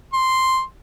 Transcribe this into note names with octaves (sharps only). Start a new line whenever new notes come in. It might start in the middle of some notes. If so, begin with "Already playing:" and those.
C6